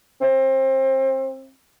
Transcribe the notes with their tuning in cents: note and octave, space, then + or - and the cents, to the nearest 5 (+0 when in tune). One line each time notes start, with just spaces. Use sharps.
C4 +30